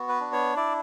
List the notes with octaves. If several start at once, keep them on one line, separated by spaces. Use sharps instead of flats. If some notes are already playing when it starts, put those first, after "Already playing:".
Already playing: B3 F#4
B4
D4
C#5
E4 D5